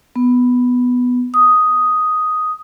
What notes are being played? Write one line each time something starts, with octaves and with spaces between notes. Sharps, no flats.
B3
D#6